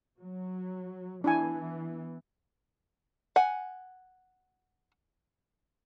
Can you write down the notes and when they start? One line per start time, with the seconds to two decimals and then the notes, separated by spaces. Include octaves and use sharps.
0.18 F#3
1.24 E3 B3 D4 E4 G#5
3.36 F#5 G#5